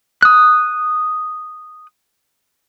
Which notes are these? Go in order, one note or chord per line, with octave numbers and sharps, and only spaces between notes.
D#6 F#6